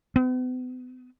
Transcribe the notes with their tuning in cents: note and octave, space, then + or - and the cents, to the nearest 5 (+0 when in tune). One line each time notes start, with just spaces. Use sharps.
B3 +40